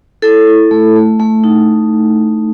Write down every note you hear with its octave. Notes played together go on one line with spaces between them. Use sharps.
E4 A4
E4
A3
A3
A3
D#4